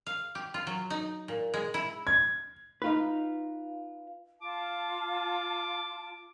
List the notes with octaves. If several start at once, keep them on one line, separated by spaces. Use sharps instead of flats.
F5
G4
F4
F#3
D#4
A#2
G#3
E4
G#6
D#4 F4 B4
F4 A5 D6